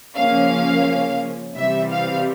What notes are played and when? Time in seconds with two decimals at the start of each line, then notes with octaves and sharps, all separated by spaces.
0.17 C#3 F3 A#3 C#4 F5
1.56 C3 E3 G3 C4 E5
1.91 F5